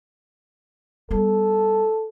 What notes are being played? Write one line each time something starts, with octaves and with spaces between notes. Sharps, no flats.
G3 B3 A4